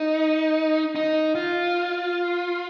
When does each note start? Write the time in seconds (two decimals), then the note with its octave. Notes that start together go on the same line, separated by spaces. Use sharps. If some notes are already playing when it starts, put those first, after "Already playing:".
Already playing: D#4
0.95 D#4
1.35 F4